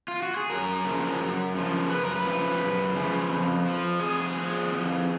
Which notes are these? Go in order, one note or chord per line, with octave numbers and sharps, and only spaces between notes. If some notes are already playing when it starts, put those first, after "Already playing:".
F4
F#4
G#4
F#2 A#4
C#3 F3
F#2
C#3 F3
F#2 B4
A#4
B4
C#3 F3
F#2
C#3 F3
F2
F3
F2 G#4
F3
F2